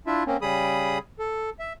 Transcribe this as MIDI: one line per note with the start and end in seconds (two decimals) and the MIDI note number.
0.07 0.23 62
0.07 0.23 64
0.07 0.23 65
0.07 0.23 76
0.27 0.37 58
0.27 0.37 60
0.27 0.37 61
0.42 0.98 49
0.42 0.98 55
0.42 0.98 68
0.42 0.98 83
0.42 0.98 87
1.19 1.50 69
1.59 1.73 76